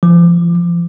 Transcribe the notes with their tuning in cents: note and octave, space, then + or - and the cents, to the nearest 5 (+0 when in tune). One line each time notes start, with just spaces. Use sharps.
F3 -35